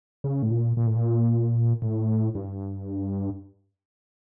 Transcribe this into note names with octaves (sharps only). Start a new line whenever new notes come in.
C#3
A2
A#2
A#2
A2
A#2
A2
G2